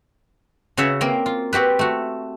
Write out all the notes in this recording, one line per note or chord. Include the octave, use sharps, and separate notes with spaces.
C#3 F#4 C#5 E5 F#5
A#3 C4 A#4
F4
C4 F#4 G4 B4
A3 F#4